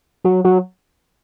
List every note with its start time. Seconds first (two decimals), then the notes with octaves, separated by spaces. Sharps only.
0.24 F#3
0.44 F#3